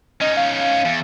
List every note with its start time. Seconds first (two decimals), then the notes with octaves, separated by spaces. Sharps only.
0.21 C#4 D#4 D#5
0.37 F5
0.85 E2